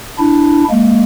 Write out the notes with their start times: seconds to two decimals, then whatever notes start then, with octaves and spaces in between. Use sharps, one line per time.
0.19 D4 E4
0.70 G#3 A#3